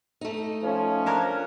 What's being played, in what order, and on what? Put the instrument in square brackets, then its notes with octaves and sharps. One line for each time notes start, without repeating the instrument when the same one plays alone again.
[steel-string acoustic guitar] A3 D#4
[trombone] F3 [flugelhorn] C#4
[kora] D4 A#4 C#5